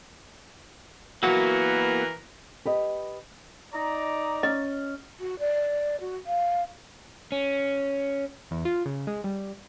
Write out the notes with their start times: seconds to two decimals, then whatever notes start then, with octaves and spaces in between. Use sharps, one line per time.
1.23 E3 F#3 A#3 B3 F#4 A#4 B4
2.65 G4 B4 D#5
3.74 D#4 D5 A#5
4.43 C#4 D#5
5.20 F#4
5.39 D5
6.00 F#4
6.26 F5
7.32 C#4
8.51 E2
8.65 F4
8.86 C#3
9.07 G#3
9.24 G3